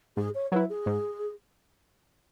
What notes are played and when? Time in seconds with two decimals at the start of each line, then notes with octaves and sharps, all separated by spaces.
0.17 G#2 G#4
0.35 C#5
0.52 F#3 E4 B4
0.70 G#4
0.86 G#2